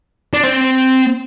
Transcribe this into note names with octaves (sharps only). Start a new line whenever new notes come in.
D4
C4